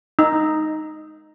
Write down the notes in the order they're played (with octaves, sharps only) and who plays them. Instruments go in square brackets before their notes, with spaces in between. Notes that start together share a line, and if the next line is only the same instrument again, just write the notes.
[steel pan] D#4